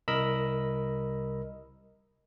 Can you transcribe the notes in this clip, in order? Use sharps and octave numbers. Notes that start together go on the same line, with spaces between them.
C2 A#4 D#5 B5 E6